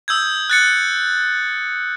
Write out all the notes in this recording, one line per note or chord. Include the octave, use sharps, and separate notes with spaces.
D#6 E6 G6 G#6
F#6 A6 C#7